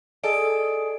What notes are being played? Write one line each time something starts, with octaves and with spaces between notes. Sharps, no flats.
G#4 A4 D5 D#5 D7